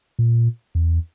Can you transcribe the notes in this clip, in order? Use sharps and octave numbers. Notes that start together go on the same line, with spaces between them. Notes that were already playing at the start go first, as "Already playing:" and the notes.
A#2
E2